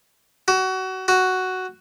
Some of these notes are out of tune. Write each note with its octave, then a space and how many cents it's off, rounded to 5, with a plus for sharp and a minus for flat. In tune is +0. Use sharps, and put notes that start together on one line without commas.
F#4 +25
F#4 +5